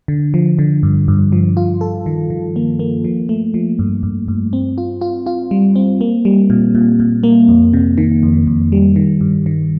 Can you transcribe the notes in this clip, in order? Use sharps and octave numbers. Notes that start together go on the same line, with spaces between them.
D3
F3
D3
G2
G2
F3
F4
A4
D#3
D#3
A#3
A#3
F3
A3
F3
G2
G2
G2
C4
F4
F4
F4
G3
C4
A#3
G3
A#2
A#2
A#2
A#3
F2
C3
D#3
F2
F2
G3
D#3
G2
D#3